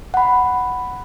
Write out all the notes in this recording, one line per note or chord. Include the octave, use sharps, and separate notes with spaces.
F#5 B5